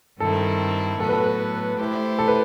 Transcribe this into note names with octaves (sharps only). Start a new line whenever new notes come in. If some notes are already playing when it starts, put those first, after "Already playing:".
G2 D#3 G3 C4 E4 A4
A2 F#3 B3 F#4 A4
B4
A4
B4
A3 E4 G4 C5
A4
B4